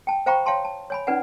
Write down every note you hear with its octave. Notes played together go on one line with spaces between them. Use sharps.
G5 A5
C5 F5 G5 A#5 B5 C#6
C#5 F5 G5 A5 C6
A5
C#5 G#5 B5
C#4 D#4 B4 D5 F#5 G#5